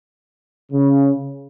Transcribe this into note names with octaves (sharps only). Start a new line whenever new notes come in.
C#3